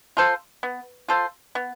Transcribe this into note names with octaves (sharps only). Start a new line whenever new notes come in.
F4 A4 C5
B3
F4 A4 C5
B3